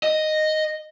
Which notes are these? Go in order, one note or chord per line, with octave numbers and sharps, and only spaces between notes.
D#5